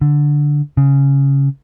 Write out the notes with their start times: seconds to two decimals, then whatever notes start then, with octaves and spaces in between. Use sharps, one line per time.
0.01 D3
0.77 C#3